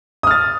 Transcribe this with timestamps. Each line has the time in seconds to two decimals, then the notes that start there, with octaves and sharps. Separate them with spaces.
0.23 D#6
0.27 F6
0.31 A6